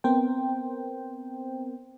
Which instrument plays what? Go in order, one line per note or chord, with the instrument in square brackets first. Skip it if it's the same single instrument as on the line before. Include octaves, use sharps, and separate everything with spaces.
[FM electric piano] B3 C4 A#4 C5 G5